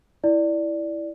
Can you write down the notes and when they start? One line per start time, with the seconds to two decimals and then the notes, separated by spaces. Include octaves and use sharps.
0.24 E4 D5